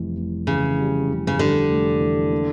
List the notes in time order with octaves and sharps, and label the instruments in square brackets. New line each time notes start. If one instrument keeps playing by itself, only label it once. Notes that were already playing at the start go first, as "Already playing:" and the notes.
Already playing: [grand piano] F1 F2 E3 G3
F1
[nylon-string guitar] C#3 [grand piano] E3
[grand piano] G3
F1
[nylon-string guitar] C#3
[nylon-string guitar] D3 [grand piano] G3
[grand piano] F1
E3
A#3